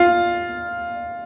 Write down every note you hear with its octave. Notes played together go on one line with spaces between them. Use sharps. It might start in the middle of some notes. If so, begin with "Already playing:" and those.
Already playing: F4